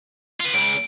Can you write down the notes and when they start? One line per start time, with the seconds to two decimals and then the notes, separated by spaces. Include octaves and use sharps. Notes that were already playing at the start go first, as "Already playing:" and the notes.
0.40 F4 B4
0.54 C#2 C#3 D7